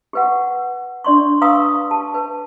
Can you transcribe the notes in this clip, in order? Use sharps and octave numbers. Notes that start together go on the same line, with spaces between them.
G4 B4 F#5
D4 D5 C6 C#6
B4 F5 A#5 C#6 D#6 E6
G4 A5
B4